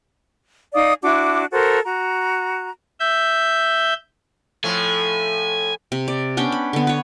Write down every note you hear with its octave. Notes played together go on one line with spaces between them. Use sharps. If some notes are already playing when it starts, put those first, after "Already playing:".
D#4 D5 F5 D#6
D4 E4 F#4 D6
F#4 A4 A#4 C5
F#4 A#5
E5 G6
A2 F3 A3 G#5
C3
D5
B3 C#4 D4 G5
B5
D3 B3
B4 C#5